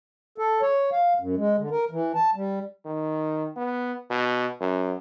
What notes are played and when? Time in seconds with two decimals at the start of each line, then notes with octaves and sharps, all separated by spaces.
0.38 A4
0.62 C#5
0.92 F5
1.20 F#2
1.37 G#3
1.58 D3
1.71 A#4
1.91 E3
2.15 A5
2.35 G3
2.86 D#3
3.57 B3
4.10 B2
4.61 F#2